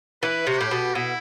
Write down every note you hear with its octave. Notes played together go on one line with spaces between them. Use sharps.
E3 B4
C3 F#4
A2 G4
B2
B2 E4